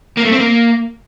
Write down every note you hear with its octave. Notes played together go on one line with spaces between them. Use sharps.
A#3
A3
C4
A#3